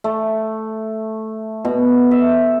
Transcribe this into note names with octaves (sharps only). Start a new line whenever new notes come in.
A3
B2
E5